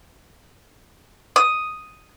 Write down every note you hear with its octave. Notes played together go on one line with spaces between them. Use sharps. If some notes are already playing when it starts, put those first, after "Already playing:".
D#6